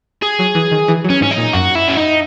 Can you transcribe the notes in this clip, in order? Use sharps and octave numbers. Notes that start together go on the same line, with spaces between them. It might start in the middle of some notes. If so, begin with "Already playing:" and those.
G#4
F#3
E3
D#3
E3
F#3
C#4
G#2 C#4
D#4
A#2
F#2 F#4
E4
C#4
D#4